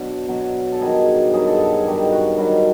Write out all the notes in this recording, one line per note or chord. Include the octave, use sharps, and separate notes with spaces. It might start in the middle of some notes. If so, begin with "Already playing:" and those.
Already playing: B2 F#3 D4
B2 F#3
A4
G2 D#3 F#3 G#4
G2 D#3 F#3 G#4
A4
A4
G#4
G2 D#3 F#3 G4
F#4
G2 D#3 F#3